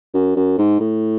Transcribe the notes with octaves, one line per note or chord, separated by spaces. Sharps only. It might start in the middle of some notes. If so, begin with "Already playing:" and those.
F#2
F#2
G#2
A2